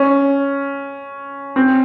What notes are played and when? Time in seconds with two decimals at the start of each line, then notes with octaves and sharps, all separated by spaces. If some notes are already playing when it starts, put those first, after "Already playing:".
Already playing: C#4
1.56 C4